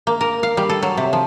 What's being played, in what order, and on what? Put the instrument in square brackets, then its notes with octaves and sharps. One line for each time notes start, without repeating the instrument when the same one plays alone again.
[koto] A#3
A#4
F5
G3
A4
F#3
C3
F3